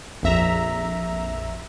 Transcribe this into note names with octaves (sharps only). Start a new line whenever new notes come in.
A#1 F2 E5 A#5